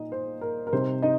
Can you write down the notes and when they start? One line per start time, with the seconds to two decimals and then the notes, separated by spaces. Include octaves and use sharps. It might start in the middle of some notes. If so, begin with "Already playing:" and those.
Already playing: A#2 D#4 D#5
0.12 C5
0.41 A#4
0.67 A#4
0.72 C3 G3 C4 D#4 C5
1.02 D#4 D#5